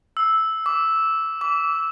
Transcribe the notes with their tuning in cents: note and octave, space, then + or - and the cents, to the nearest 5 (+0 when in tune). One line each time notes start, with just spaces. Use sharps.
E6 -5
D6 -25
D6 -35